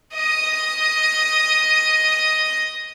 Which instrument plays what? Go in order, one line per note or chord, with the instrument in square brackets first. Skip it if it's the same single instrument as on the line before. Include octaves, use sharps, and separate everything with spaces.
[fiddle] D#5 D#6